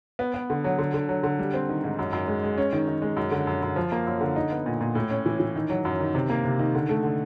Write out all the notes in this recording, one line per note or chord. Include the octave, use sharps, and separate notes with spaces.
B3
B3
D3
F#3
D3
D3
F#3
D3
G3
C4
D#3
G#2
F#2
F#2
G#3
G#3
C#4
D#3
D#3
G#3
F#2
D3
F#2
F#2
F3
A#3
F#2
D3
D#4
B3
A#2
A#2
A2
C#4
E3
E3
D#3
F#3
F#2
D#3
C3
A#3
C3
D#3
D3
A3
D3